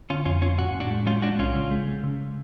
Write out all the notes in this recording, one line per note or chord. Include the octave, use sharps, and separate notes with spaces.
D3 C#4 F4
F2 C#4 F4
F2 C#4 F4
A2 F#4
A2
D4 F#4
G#3
G#3 C#4 F4
G#3 D4 F#4
B1 C#4 F4
C#3
G#3
G#3
C#3